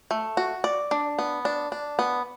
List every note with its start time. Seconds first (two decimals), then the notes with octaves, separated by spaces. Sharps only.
0.11 A3
0.37 F#4
0.64 D5
0.91 D4
1.19 B3
1.45 D4
1.72 D4
1.99 B3